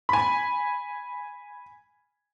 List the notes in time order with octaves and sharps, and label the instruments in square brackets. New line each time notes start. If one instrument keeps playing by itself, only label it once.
[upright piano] G#5 B5